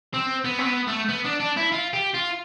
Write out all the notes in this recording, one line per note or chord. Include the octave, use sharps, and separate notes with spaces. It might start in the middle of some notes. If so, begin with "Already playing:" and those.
C4
B3
C4
B3
A3
B3
D4
D4
E4
F4
G4
F4